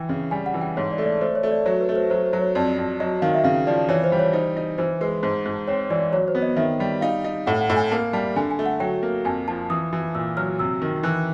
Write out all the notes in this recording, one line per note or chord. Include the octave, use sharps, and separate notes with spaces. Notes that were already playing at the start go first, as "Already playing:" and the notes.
Already playing: E3 G5
C#3
G3 G#5
F#5
E3
G5
G#2 C#5
D5
A3
D5
A3 C5
C#5
A3
D5
F#3 C#5
B4
A3
C5
F#3 C5
C5
F#3
C#5
F2 D5
F2
F#3 D#5
D#3 F5
E5
C#3 F5
F3 D5
E3 C#5
C5
G3
C#5
D#4 C5
D#4
E3 C5
G#3 B4
G#2 C5
G#2
C4 C#5
E3 D5
F#3 C#5
C5
B3
D#5
D#3 E5
G3
D#4 F5
D#4
A2 F#5
F#5
A2
G#5
A#3 A5
G3 A5
D3 G#5
G#5
A3
F#5
F#3 G5
A#3
F2 G#5
F3 A5
E3 D#6
E3
A#2 E6
F#3 F6
C3 E6
D#3
E3 F#6